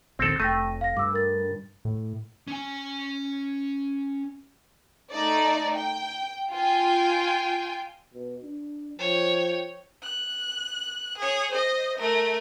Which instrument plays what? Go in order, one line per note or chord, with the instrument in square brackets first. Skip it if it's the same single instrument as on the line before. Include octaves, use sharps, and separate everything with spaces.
[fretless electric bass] A#1 D#2 [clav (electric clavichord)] C4 A4
[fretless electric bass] F1 [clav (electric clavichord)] A3 [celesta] G5 A#6 D#7
[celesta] F5 A#6
[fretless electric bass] G2 [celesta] D6 E6
[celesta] A#4 A6
[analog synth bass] A2
[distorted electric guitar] C#4 G#5
[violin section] A3 D#4 D5
G5
F4 G5 G#5
[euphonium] B2
D4
[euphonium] F3 [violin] C#5 G5
[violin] F#6
G#4 C#5
C5 D#5
A3 A#4